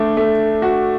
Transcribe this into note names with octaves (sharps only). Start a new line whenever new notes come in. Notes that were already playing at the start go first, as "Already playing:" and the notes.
Already playing: A3 D4
A3
F#4